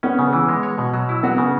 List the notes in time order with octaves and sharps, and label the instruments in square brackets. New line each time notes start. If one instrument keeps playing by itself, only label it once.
[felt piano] B3 [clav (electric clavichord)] C#4
[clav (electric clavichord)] C#3
E3
G#3
C#5
B2
F#3
E4
[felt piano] B3 [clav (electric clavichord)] F#4
[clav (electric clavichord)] C#3